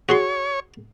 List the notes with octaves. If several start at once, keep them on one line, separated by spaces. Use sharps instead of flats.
F#4 G#4 C#5 C6